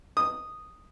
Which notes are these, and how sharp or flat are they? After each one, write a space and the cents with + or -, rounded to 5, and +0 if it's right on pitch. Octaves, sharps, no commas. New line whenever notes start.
D#6 -5